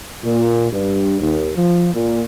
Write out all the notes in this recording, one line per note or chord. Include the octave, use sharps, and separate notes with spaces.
A#2
G2
D#2
F3
A#2